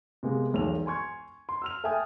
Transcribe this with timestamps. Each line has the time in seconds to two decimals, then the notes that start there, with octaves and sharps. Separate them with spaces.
0.23 C3 G#3 A#3 B3
0.53 E1 B1 A#3 F7
0.86 G#5 C6 C#6 G#6
1.49 C6
1.62 E6 F6 F7
1.84 A4 E5 G5 G#5 D#6 F6